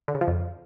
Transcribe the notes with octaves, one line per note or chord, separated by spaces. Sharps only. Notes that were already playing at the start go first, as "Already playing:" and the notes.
D3
C#3
F3
F2